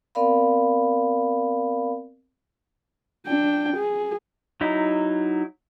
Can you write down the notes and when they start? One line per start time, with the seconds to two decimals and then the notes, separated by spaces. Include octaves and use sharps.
0.15 B3 C4 A#4 D5 F5 B5
3.27 D4 G5
3.76 G#4
4.61 F#3 D#4 E4